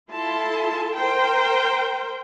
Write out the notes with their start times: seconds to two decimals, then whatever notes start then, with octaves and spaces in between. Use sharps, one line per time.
0.10 E4 F4 A4 A5 C6
0.94 A#4 C5 G5